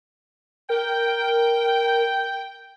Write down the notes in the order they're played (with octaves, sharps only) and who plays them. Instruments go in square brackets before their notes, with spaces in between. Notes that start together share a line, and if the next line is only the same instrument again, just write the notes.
[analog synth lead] A#4 [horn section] G5